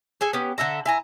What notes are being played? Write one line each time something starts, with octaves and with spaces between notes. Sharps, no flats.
G#4 A4 G#5
B3 C#4 G4
D3 A4 E5 A#5
E4 G#5 A#5